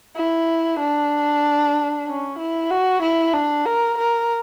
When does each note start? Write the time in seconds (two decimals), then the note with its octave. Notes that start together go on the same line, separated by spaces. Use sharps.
0.16 E4
0.79 D4
2.07 C#4
2.38 E4
2.70 F#4
3.02 E4
3.33 D4
3.65 A#4
3.98 A#4